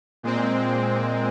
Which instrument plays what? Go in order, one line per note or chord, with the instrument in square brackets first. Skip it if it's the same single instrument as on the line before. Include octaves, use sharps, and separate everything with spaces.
[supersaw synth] A#2 G#3 C4